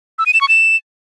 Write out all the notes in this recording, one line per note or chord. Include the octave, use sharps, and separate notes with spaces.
E6
D#7
E7
C#6
E7